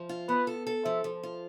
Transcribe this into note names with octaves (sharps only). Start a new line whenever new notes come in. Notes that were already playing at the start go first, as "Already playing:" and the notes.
Already playing: F3
F4
B3 B4
A4
A4
F3 E5
F3
F4